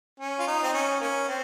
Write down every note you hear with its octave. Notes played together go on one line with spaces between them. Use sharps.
C#4
F4
D#4
C4
C#4
A#3 C#4
C4